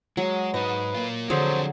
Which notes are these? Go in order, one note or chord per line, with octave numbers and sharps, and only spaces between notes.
F#3 G#3
G#2 D#4 B4 D#5
A#3 F4
D3 F3 F#3 C4 D4 G#4 C5